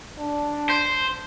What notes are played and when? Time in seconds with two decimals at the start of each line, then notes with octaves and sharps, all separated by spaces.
0.18 D4
0.70 C5